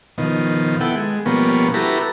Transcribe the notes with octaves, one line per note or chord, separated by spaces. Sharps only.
B2 D#3 F3
B3 E4 A4 F#5 G5
G#3
B2 F3 G3 A#3 B3 C#4
E4 F#4 G4 A4 B4 A#5